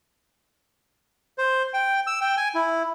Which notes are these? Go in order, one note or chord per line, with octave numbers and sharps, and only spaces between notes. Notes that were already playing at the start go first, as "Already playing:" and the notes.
C5
G5
E6
G5
G#5
E4